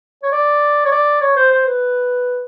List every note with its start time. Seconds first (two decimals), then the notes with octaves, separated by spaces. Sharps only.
0.23 C#5
0.32 D5
0.85 C#5
0.92 D5
1.21 C#5
1.36 C5
1.51 C5
1.66 B4